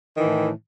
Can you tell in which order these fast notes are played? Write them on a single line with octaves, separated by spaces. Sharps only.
D#3 E3 A2